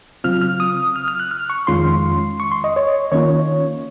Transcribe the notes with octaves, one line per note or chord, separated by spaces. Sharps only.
C#3 F#3 C4 F4 F6
F6
D#6
F6
F6
F#6
F6
C#6
F2 D#3 G#3 C#4 F4 C6
C#6
C6
D#5
C#5
D#3 A#3 C#4 F4 C#5